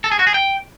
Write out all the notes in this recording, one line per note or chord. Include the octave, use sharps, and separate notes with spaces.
A4
G#4
F#4
G#4
G5